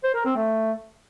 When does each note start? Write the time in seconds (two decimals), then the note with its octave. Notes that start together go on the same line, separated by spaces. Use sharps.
0.04 C5
0.15 A#4
0.25 C4
0.36 A3